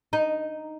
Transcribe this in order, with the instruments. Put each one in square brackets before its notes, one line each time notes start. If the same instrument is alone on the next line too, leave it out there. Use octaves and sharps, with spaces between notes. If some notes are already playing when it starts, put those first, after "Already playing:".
[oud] D#4